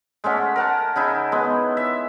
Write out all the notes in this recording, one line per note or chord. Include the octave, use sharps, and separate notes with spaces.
G#3 A3 C#4 F#5
A#4 F#5 A5
C#3 D#4 E4
G#3 B3
E5